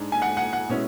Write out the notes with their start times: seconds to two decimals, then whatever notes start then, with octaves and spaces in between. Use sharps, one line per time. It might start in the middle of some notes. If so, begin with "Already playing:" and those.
Already playing: G#2 G#3 D4
0.12 G#5
0.22 F#5
0.37 F#5
0.53 F#5
0.69 B2 G#3 C#4 E4